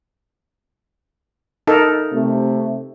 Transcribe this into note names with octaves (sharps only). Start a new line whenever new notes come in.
D#4 A4 A#4
C3 A3